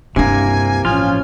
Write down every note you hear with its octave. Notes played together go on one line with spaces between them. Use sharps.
G2 C3 A#3 D4 E4 G#5
A1 F3 C#4 F4 G#5